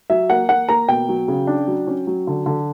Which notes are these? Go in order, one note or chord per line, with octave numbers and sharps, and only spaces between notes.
F#3 E5
A#3 F#5
A#3 F#5
A#3 A#5
B2 G5
F#3
C#3
D4
F#3
C#4
F#3
D3
D3